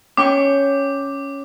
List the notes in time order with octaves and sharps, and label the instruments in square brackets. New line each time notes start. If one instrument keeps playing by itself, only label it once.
[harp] C#4 G5 C#6 [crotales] D6